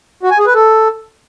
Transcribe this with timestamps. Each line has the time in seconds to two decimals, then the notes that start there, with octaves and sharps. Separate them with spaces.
0.23 F#4
0.31 G#5
0.39 G#4
0.47 B4
0.54 A4